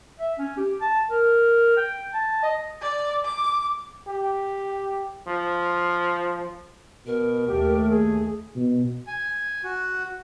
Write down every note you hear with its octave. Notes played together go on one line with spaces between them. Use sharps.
E5
C#4
G4
A5
A#4
G5
A5
D#5
D5
D6
G4
F3
B2 A#4
D#2 A3 G4
G#4
B2
G#5
F#4